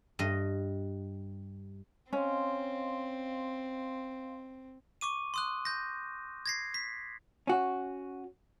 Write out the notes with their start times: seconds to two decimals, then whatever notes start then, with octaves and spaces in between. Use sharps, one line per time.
0.19 G2 D#5
2.13 C4 C#4 D#5 F5 C6
5.01 C#6 D6 D#7
5.34 C6 D#6 F#6
5.65 G6 A#6
6.46 G#6 A#6 C7
6.74 B6
7.47 C#4 F#4